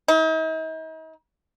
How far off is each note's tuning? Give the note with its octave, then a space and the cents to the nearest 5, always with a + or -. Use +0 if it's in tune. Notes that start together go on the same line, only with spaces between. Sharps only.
D#4 +45